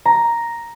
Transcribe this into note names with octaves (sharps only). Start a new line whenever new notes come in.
A#5